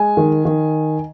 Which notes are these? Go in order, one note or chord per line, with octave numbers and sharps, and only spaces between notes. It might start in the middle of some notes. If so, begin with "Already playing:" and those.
Already playing: G#3 G#5
D#3
D#3